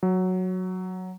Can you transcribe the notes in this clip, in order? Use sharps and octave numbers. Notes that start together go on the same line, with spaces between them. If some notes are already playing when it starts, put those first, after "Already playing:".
F#3